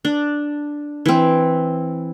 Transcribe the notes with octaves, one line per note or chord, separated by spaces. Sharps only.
D4
E3 C4